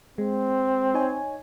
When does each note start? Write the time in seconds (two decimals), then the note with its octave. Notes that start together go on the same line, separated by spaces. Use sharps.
0.18 G#3 C4
0.94 D#4 C#5 G#5